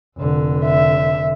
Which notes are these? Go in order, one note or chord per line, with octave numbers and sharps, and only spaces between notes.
F1 D3
E5